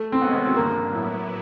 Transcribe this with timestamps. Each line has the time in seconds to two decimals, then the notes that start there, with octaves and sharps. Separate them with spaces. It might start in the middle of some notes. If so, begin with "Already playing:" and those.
Already playing: A3
0.12 C4
0.21 C3 D#3 G#3 B3 C#4 F#4
0.34 B3
0.45 C4
0.56 G2 D3 F3 A#3
0.91 A2 F#3 B3 E4